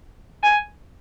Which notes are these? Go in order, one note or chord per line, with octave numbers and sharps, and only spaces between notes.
G#5